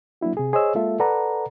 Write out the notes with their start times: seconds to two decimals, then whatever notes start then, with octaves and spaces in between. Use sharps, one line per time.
0.21 F#3 A#3 D4 E4 F#4
0.37 C3 G#4
0.53 G#4 C5 C#5 D#5 E6
0.75 G#3 A#3 F4 A4 E5
1.00 A4 B4 D5 F#5 A#5